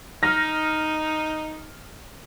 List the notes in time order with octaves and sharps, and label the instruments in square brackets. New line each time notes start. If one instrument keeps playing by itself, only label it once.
[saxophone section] D#4 [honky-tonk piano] F6 A#6